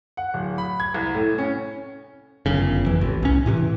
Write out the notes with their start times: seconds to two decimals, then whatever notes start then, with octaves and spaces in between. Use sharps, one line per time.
0.17 F#5
0.34 D1
0.58 B5
0.80 G#6
0.94 C2
1.14 A2
1.38 C#4
2.46 G1 F#2 C#3
2.86 F2 E3
3.01 A1
3.23 C2 C#4
3.46 A2 C3 D#3 E3